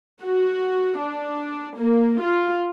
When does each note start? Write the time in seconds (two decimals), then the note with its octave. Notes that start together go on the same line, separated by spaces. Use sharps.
0.23 F#4
0.98 D4
1.77 A#3
2.21 F4